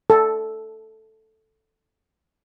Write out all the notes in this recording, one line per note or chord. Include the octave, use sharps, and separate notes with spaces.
A4